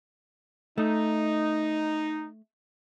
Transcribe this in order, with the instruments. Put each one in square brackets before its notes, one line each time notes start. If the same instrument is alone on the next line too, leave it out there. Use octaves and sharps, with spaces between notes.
[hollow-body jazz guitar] A3 [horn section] D#4